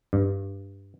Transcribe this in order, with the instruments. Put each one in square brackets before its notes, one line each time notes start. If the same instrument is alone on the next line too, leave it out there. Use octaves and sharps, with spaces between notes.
[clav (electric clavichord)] G2